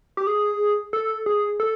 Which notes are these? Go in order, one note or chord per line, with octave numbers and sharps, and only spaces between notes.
G4
G#4
A4
G#4
A4